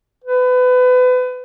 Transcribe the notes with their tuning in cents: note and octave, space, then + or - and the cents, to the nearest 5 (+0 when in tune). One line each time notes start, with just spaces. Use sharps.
B4 +30